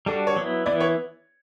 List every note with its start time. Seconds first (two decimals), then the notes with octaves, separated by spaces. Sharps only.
0.06 G3 D4 F#4 A4
0.27 C#5
0.36 F#3 B3 E4
0.66 E3 B3 E4 D5
0.80 C#5